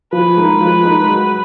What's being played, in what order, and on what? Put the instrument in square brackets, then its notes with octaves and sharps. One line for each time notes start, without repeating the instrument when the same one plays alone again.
[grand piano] F3 [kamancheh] B4
[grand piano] G#3 D#4 A#4
F3
G#3 D#4 A#4
F#3